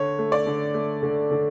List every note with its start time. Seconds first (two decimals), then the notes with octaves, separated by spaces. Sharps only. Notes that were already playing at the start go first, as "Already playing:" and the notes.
Already playing: D3 C#5
0.19 A3
0.32 D5
0.46 D3
0.74 A3
1.03 D3
1.31 D3